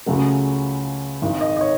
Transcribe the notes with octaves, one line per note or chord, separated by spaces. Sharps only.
C#2 C#3 F#3 A3
G#1 G#2 D#3
D#5
D#5
C#5